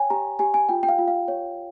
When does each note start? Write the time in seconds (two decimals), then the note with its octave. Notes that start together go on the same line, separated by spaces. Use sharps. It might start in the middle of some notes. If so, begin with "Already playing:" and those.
Already playing: C#5 G5 G#5
0.10 G4 A#5
0.39 G4 G#5
0.54 G#5
0.69 F4 G5
0.83 G5
0.89 F5
0.98 F4
1.08 F5
1.28 C#5